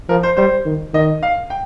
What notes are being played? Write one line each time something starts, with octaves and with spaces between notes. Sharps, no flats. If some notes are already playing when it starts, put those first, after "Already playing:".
F3 A#4
C5
G3 C5
D#3
D#3 D#5
F5
G5